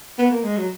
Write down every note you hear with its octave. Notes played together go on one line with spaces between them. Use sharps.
B3
A#3
G#3
F#3